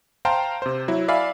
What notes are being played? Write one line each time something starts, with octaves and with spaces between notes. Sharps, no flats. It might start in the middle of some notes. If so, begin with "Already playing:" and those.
C5 F5 G5 A5 A#5 C6
C3 C5
F#3 E4
D5 E5 F5 G#5 B5